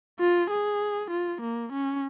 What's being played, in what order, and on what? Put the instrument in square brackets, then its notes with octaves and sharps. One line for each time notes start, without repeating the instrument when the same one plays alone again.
[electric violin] F4
G#4
F4
A#3
C#4